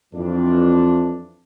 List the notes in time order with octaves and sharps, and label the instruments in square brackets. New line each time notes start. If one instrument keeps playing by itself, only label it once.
[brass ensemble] F2 E3 D4